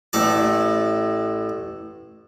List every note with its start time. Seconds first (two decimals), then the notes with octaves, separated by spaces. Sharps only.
0.13 A1 A2 A4 D5